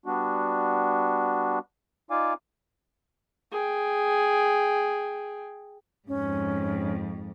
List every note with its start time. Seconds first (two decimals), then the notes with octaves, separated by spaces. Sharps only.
0.06 G3 B3 D4 F#4
2.11 D#4 F4 D5 F5 G#5 D6
3.52 G#4 G5
6.08 F2 G#2 C#4